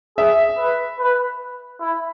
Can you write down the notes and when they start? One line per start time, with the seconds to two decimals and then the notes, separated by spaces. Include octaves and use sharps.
0.17 G#4 E5
0.58 B4
0.99 B4
1.80 E4